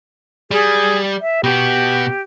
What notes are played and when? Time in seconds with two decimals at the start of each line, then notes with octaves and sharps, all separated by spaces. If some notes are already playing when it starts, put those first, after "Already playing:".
0.51 G3 G#4
1.21 E5
1.44 B2 B3 G4